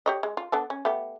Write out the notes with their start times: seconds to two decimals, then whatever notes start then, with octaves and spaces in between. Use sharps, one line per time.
0.06 G4 C#5 D#5
0.23 G#3
0.37 F4
0.52 B3 D4 A4
0.70 C#4
0.85 A3 B3 G4